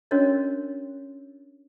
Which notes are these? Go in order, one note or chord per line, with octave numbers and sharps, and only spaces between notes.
C#4 D4 F#4 A#4 C#5 D#5